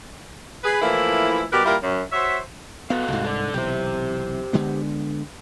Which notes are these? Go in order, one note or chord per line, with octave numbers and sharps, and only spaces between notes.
G#4 B4
E3 F3 A3 A#3 E4
B2 G3 G4 A#4 B4 D5
G3 A#3 E4 F4 G4 A#4
F#2
F#4 C5 C#5 E5
B3 F#4 A4 F5
C2 G#2
A4 D5
B1 C3 E3 G4 C5
D3 G#3 B3